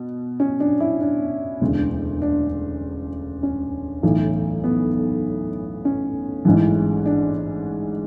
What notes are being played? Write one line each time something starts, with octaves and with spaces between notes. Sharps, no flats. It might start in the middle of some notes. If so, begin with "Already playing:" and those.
Already playing: B2
C#4
D4
E4
D4
E1 D2 C#3
D4
C#4
B1 A2 E3
B3
C#4
A1 G#2 E3
D4